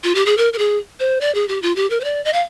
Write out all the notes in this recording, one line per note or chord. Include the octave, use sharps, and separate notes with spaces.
F4
G4
G#4
A#4
A#4
G#4
C5
D5
G#4
G4
F4
G4
A#4
C5
D5
D#5
F5